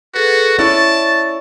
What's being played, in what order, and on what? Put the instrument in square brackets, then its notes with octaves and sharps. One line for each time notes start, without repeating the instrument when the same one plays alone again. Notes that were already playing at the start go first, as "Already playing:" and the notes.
[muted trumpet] F#4 [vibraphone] G#4 A4 B4
[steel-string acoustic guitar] C#4 E4 D5 [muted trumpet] A5 [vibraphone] C#6